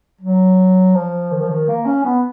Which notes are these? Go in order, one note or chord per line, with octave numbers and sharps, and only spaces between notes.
F#3
F3
D#3
F3
D#3
A#3
C#4
B3